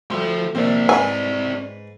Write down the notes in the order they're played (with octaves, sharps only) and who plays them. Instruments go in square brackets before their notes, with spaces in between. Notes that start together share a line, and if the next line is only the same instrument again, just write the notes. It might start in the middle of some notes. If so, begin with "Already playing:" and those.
[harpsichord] D2 G3 [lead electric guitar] F3 C6
[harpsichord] A#1 D#2 C3 [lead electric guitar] C4 D5
[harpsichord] G#2 B4 [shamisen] G#5